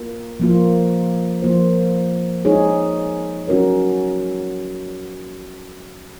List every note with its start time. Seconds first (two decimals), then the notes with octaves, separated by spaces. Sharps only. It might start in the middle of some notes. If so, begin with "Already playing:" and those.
Already playing: A#3 F4 A#4
0.40 F3 A#3 F4
1.42 F3 A#3 F4 C5
2.45 G#3 D#4 G#4 C#5
3.48 F#3 C#4 F#4 A#4 C#5